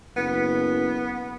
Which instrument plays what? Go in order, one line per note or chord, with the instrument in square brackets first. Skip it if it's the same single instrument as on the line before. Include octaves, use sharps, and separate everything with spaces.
[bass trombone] F#1 [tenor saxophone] B3